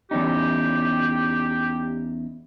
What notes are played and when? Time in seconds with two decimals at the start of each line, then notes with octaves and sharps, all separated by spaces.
0.11 E2 C#4 D#4 G4